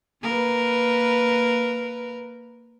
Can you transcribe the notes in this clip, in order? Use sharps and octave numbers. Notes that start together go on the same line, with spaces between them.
A#3 A#4 B4